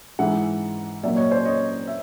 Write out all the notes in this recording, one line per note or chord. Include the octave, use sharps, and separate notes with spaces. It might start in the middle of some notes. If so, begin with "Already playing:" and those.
G#2 E3 G#3 E5 F#5
A#2 F#3 A#3 D5 E5
C#5 D#5
C5 D5
C#5 D#5
E5